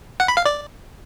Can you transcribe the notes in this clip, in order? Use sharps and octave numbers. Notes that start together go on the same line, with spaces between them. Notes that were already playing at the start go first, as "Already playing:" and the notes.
F#5
B5
F5
D5